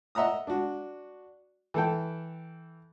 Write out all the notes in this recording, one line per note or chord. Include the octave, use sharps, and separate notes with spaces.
D#5 E5 F#5 A#5 D#6
D4 F#4
E3 A4 G5